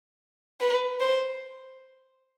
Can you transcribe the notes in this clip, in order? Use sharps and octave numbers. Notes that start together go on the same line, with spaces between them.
B4
C5